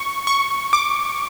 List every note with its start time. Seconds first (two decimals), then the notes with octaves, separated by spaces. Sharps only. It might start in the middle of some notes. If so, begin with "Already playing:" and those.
Already playing: C#6
0.27 C#6
0.73 D6